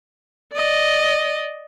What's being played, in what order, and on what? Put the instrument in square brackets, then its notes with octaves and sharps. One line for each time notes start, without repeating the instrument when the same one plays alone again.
[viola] D5 D#5